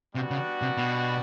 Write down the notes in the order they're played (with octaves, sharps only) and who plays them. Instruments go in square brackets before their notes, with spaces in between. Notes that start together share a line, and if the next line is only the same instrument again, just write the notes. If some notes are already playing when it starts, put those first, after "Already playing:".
[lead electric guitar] C3 [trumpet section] G3 B3 D4 F#4
[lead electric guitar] C#3
C3
B2